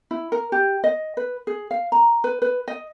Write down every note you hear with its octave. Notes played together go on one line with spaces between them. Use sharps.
E4
A#4
G4
D#5
B4
G#4
F5
A#5
B4
B4
D#5